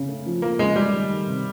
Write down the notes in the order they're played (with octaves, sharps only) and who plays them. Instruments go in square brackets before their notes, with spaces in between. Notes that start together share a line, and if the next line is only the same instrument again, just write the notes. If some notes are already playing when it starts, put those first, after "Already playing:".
Already playing: [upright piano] C#3
A3
F3
[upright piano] F3 [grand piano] A#3
[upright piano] C#3 [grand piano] G#3
[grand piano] G3 [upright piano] A3
[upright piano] D#3
D#3
C3